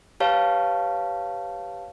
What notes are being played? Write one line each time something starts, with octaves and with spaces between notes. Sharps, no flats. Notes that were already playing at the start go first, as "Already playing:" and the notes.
G4 B4 C#5 F5 A5